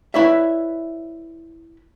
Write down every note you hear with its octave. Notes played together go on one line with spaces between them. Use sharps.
E4 B4 C#5 D5 E5